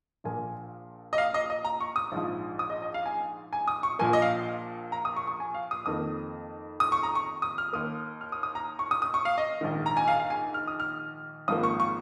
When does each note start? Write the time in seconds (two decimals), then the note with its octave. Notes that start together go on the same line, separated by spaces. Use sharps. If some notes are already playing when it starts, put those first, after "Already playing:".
0.24 A#1 A#2 F3 A#3 G#5
1.13 D#5
1.18 F5
1.34 D#5
1.50 D#5
1.64 A#5
1.80 C#6
1.96 D#6
2.12 A#1 G#2 F3
2.59 D#6
2.70 D#5
2.82 D#5
2.94 F5
3.06 G#5
3.53 G#5
3.68 D#6
3.83 C#6
3.99 A#1 A#2 F3 A#3 G#5
4.13 D#5
4.22 F5
4.92 A#5
5.05 D#6
5.16 C#6
5.27 C#6
5.40 G#5
5.54 F5
5.71 D#6
5.86 F2 D#3 A#3 D#6
6.80 D#6
6.92 C#6
7.03 A#5
7.15 C#6
7.42 D#6
7.58 F6
7.73 D#2 D#3 A#3 D#6
8.21 F6
8.32 D#6
8.43 D#6
8.55 A#5
8.79 C#6
8.91 D#6
9.02 D#6
9.14 C#6
9.25 F5
9.38 D#5
9.61 A#1 G#2 D#3
9.86 A#5
9.97 G#5
10.08 F5
10.20 F5
10.30 G#5
10.54 F6
10.67 D#6
10.80 F6
11.48 G#1 G#2 F3 A#3 D#6
11.63 C#6
11.80 C#6